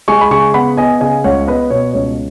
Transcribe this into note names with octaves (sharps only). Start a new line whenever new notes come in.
G#3 G#5 C#6
B5
C#3 G#5 C#6
B3 F#5 B5
B3 D#5 G#5
C#3 D#5 G#5
C#2 C#5 F#5
B3 B4 D#5
B2 C#5
C#2 C#5